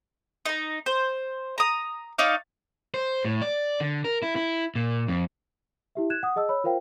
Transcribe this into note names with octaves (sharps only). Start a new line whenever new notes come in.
D#4 A#5
C5
A#5 D#6
D#4 C#5 D5 F5
C5
A2
D5
D3
A#4
E4
E4
A#2
F2
E4 G4 E5
F#6 G#6 E7
F#5 D#6
G#4 D#5 A5 E6
C#5 B5 E6
F4 A#4 C5 F5 G5